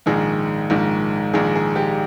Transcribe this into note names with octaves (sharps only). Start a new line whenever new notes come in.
A#1 G#2 D#3 G#4
A#1 G#2 D#3
A#1 G#2 D#3 G#4
G#4
G4